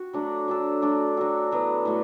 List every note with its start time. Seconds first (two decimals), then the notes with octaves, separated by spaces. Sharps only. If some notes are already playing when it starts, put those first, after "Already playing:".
Already playing: F#4
0.13 F#3 A3 D4
0.48 F#3 D4 A4
0.82 F#3 A3 D4 F#4
1.17 F#3 D4 F#4 A4
1.51 A2 F#3 B3
1.85 A2 A3 F#4